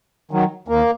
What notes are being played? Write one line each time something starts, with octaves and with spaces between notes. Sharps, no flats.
D#3 F#3
D#2 A#3